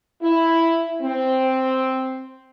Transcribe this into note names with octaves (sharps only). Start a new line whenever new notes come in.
E4
C4